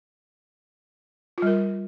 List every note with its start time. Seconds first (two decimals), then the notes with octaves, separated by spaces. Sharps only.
1.38 F4
1.42 G3
1.47 A#4